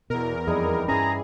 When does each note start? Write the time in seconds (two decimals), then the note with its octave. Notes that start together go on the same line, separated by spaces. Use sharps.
0.10 E2 B2 A#4
0.47 F2 G3 D#4 E4 G#4
0.88 G2 E3 C#4 G#4 A#5